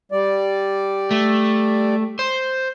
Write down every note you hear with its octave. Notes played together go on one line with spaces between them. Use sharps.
G3 D5
A3
C5